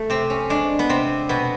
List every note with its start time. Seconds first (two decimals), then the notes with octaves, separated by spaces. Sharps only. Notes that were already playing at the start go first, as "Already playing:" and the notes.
Already playing: A3
0.10 C3 C4
0.30 C#4
0.50 G#3 D4
0.79 B3
0.89 C3 C4
1.29 B2 B3